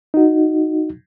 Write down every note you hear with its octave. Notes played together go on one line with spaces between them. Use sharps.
D#4 F#4